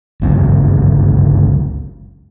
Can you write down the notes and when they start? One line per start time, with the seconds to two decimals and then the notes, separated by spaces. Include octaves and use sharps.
0.22 G1 C#2 F#2